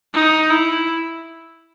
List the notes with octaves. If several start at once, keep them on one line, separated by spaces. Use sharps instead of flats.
D#4
E4